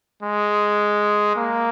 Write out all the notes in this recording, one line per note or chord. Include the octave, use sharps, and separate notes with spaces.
G#3
A#3